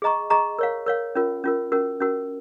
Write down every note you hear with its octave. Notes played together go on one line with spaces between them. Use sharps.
G#4 D#5 A#5 C#6
G#4 D#5 A#5 C#6
A#4 C#5 F5
A#4 C#5 F5
C#4 F4 A#4
C#4 F4 A#4
C#4 F#4 A#4
C#4 F#4 A#4